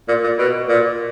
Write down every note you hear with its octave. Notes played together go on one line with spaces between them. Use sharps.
A#2
A#2
B2
A#2